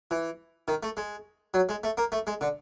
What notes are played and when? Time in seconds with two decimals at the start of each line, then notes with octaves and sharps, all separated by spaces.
0.11 E3
0.68 D#3
0.83 A3
0.97 G#3
1.54 F#3
1.69 G#3
1.84 A3
1.98 A#3
2.12 A3
2.27 G#3
2.41 D3